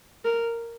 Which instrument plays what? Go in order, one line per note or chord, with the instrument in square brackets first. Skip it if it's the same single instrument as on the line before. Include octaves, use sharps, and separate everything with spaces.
[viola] A#4